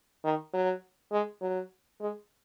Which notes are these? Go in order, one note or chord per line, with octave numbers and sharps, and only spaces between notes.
D#3
F#3
G#3
F#3
G#3